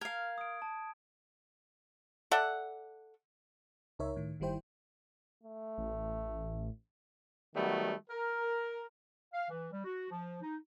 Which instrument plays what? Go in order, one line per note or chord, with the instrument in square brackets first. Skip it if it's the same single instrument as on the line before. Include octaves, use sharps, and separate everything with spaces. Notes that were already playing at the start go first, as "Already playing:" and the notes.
[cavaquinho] A#4 F5 [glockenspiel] G#6
[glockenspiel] D#6 D7
A5
[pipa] A4 D5 E5 F#5
[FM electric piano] C#2 D#4 A#4 C#5 E5
A2 D#3
G1 D#3 G3 E4 C5 G5
[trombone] A3
[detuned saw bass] A1
[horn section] D#3 F#3 G3 A3 B3
A#4
[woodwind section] F5
E3
G3
F#4
F3
D#4